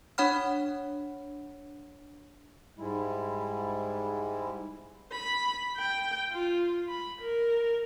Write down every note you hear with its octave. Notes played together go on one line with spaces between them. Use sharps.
D4 C#5 F#5 B5 F6
G#2 G3 G#3 E4
B5
G5
F4
B5
A#4